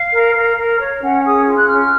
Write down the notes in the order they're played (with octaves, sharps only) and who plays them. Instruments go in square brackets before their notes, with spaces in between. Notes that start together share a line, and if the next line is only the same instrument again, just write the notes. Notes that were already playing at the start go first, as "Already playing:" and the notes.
Already playing: [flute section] F5
A#4
A#4
A#4
C#5
C#4 F#5
G#4 D#6
F4
F#6
C#4 F6
F6